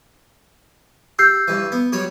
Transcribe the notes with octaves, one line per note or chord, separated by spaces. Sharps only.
G4 E6 G6 C7
G2 E3
B3
F#3 G3 C#5